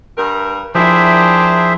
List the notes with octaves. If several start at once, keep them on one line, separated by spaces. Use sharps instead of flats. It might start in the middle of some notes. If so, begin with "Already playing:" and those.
G2 A#4
F3 D4 E4 G4 G#4 A#4 C5 E5